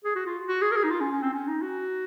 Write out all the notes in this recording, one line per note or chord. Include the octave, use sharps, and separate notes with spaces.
G#4
F#4
F4
F#4
G#4
A#4
G#4
D#4
F4
C#4
C#4
C4
C#4
D#4
F#4